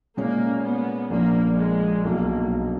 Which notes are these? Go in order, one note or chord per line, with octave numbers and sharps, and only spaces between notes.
A#2 G#3 A#3 C#4
B3
A#1 A#2 F3 A#3
G#3
B1 B2 F#3 A#3